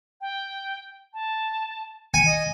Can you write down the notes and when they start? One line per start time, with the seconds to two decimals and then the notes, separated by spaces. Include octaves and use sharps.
0.21 G5
1.14 A5
2.14 G#5 C#7
2.26 D#5